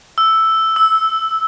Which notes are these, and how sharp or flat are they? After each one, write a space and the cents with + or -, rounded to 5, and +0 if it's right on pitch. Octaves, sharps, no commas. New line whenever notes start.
E6 +0
E6 -15